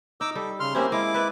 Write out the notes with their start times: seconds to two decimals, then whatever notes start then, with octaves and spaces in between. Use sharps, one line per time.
0.21 D#4 D6 E6
0.35 G3 A4
0.60 C#3 C6 F6
0.75 A#3 C4 C#4 E4 G4 C5
0.92 G#3 E4 D6
1.14 B4 D5 E5